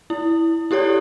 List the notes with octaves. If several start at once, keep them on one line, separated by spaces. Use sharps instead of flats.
E4
E4 G4 A4 C#5 D5